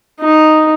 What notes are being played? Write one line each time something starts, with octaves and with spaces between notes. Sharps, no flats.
D#4